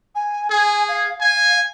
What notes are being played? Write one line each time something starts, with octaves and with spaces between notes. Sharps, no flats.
G#5
G#4 G#5
F5
F5 G#5